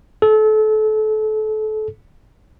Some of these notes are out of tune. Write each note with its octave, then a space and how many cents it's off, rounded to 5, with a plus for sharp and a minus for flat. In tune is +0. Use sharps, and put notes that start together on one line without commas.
A4 -30